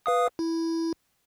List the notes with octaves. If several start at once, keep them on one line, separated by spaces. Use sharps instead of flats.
B4 F5 D#6
E4